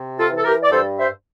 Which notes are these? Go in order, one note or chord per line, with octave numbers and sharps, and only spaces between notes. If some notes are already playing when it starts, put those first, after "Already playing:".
Already playing: C3
F4 A4
E3
A4
G4 A#4
D5
G2 A4 C5
C5 E5